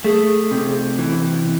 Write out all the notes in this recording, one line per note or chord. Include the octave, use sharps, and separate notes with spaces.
A3 G#4
C3
E3